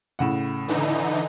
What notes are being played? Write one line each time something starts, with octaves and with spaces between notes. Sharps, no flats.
A2 C#3 F#5
D3 E3 D#4